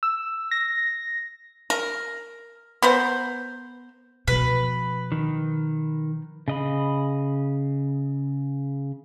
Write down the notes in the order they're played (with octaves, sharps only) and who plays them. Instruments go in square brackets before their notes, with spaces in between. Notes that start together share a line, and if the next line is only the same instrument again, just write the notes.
[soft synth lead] E6
A#6
[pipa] A#4
B3 A#4 C5
[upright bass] B2 F3 [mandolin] B4
[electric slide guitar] D#3
[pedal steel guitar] C#3 D#5 B5